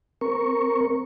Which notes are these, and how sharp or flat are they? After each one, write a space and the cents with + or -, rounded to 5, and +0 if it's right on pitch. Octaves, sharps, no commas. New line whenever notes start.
C4 +0 A#4 +0 C#6 +0